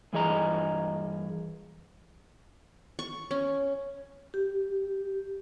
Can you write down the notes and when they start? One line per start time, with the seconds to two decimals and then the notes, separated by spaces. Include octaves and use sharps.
0.13 G2 E3 G#4 D#5 A#5
2.99 C#6
3.31 C#4
4.34 G4